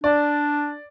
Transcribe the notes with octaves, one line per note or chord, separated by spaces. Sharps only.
D4 D5